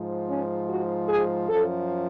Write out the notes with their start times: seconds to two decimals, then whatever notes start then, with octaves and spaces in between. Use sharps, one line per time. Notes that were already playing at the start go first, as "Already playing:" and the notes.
Already playing: G#2 F3
0.28 C#4
0.68 F#4
1.08 G#4
1.49 F#2 F3 A4